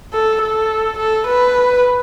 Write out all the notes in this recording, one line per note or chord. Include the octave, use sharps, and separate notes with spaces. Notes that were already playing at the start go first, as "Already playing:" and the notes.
A4
A4
A4
B4